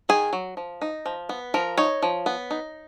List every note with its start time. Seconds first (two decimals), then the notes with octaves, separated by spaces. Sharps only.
0.09 D#3 G#4
0.33 F#3
0.57 F3
0.82 D#4
1.06 F3
1.29 B3
1.54 F3 A#4
1.77 D#4 C#5
2.02 F3
2.26 B3
2.51 D#4